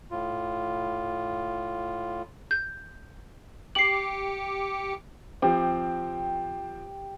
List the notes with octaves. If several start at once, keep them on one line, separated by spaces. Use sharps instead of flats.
A2 F4
G6
G4 D6 C7 C#7 F#7
F3 C4 G4